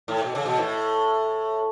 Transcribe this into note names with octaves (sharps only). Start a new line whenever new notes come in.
A2
B2
C#3
B2
A2